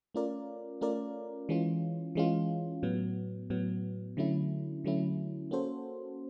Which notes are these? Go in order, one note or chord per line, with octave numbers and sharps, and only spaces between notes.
A3 C#4 F4 A#4 D5
A3 C#4 F4 A#4 D5
E3 G#3 C#4 F4
E3 G#3 C#4 F4
A2 F#3 B3
A2 F#3 B3
D3 F#3 A3 C#4 E4
D3 F#3 A3 C#4 E4
A#3 C#4 F#4 A4 C5